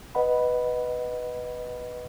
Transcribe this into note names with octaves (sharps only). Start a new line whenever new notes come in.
B4 D#5 F#5 B5